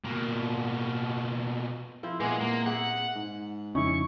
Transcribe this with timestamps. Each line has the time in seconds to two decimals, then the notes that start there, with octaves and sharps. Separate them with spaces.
0.04 B2 A#3
2.03 F3 C4 E4
2.20 A#2 G#3 B3 C4
2.41 A#3
2.66 G#4 E5 F#5
3.16 G#2
3.75 F2 C#3 C#4 D#4 E4 C#6